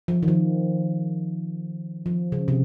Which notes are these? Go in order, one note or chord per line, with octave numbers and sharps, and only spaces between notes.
F3
D#3
F3
F3
C#3
C3